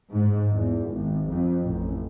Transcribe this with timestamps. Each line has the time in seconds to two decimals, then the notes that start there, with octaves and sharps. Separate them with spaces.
0.11 G#2
0.52 E2
0.87 G#1
1.28 F2
1.63 A1